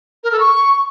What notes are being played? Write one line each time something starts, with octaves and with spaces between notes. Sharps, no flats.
A#4
A4
C#6